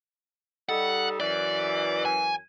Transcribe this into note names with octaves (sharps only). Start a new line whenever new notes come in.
G3 D#4 A4 F#5
F#2 E3 D5
G#5